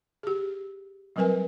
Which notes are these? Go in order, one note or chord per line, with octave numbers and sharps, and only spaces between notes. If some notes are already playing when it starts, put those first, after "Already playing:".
G4 G#4
F#3 G3 C4 A#4 B4 G#5